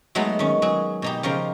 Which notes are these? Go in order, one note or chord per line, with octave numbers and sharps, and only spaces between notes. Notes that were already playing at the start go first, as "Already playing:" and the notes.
F#3 G#3 A3 B3 D#4
D#3 C#4
F#3 G#4
B2 D#4 G4
C#3 F3 A#4 G5